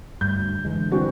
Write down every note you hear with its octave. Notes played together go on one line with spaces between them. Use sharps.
D2 G2 G6
D3 E3 G#3
C2 E3 C4 D4 F#4